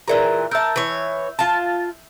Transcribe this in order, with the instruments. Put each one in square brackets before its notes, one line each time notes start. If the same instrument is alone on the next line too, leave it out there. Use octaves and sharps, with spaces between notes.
[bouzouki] A#2 E3 A#5 [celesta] G#4 A#4 D5
[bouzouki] A#4 A5 [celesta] E5 E6 G6
[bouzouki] E3 C#5
F4 A5